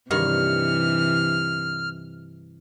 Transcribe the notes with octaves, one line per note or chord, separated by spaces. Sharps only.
G2 C3 D#3 E3 C#5 F6